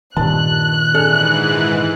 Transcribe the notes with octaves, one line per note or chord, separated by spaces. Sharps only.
G2 A#2 D#3 A5 F#6
G#2 E3 D4 G#4 A4